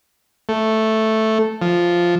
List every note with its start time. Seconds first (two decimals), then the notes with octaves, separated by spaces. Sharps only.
0.49 A3
1.62 F3